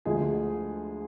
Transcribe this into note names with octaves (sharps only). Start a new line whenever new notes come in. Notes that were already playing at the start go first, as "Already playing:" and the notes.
D2 D3 F3 G#3 G#4